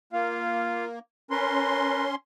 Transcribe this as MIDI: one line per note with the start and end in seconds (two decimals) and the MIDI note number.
0.13 0.99 58
0.13 0.85 65
0.13 0.85 77
1.31 2.15 61
1.31 2.05 70
1.31 2.05 71
1.31 2.15 84